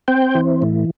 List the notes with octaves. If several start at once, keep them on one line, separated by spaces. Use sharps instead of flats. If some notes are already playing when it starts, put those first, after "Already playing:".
C4 G5
E3
A2